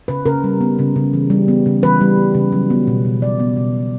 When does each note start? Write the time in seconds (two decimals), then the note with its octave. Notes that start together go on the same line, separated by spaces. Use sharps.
0.08 C#3 B4
0.26 C#3 A#4
0.44 G3
0.61 B3
0.79 C#3
0.96 C#3
1.13 E3
1.30 G3
1.48 B3
1.66 C#3
1.83 E3 B4
2.01 G3
2.18 B3
2.34 C#3
2.52 F#3
2.70 B3
2.87 B2
3.05 B2
3.22 F#3 D5
3.40 B3
3.57 B2
3.74 B2